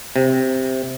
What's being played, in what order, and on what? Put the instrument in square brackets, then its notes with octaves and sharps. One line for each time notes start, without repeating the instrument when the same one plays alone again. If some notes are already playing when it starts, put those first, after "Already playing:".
[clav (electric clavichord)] C3